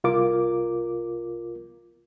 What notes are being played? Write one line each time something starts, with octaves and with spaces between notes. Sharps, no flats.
C2 F4 A#4 D6